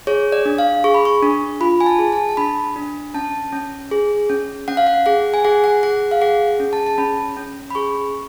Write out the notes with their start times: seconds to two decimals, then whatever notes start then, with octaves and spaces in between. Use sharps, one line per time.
0.07 G#4 C#5
0.32 D5
0.45 D4
0.58 F5
0.84 G#4 C#6
0.94 B5
1.05 C#6
1.23 D4
1.61 F4 B5
1.81 G#5
1.86 A5
1.99 G#4
2.12 A5
2.29 A5
2.37 D4 B5
2.76 D4
3.14 C#4 A5
3.52 C#4
3.91 G#4
4.30 C#4
4.68 C#4 F#5
4.77 F5
4.87 F#5
5.06 G#4 F#5
5.34 G#5
5.45 G#4 F#5
5.64 F#5
5.83 G#4 F#5
6.11 F5
6.21 G#4 F#5
6.60 C#4
6.73 A5
6.86 A5
6.98 C#4 B5
7.36 C#4
7.71 B5
7.75 G#4 C#6